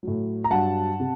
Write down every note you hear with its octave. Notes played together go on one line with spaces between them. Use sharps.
A2 F#3
A#5
G2 F#3 F#5 A5
C3